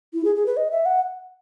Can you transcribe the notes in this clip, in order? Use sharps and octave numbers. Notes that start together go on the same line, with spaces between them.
E4
G#4
G#4
B4
D#5
E5
F#5